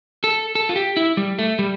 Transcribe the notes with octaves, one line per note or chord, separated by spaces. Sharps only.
A4
A4
F4
G4
E4
G3
A3
G3